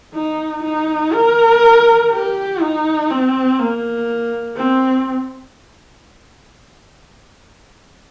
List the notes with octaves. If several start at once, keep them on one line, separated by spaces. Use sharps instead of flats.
D#4
D#4
A#4
G4
D#4
C4
A#3
C4